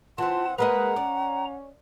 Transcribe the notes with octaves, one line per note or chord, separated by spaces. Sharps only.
E3 C4 F4 F#5 A5
G#3 A#3 B4 D#5 F#5 A#5
C#4 D5